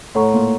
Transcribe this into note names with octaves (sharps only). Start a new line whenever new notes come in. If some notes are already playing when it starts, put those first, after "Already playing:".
A2 A4 C#5 F#5 A#5 C#6
A#2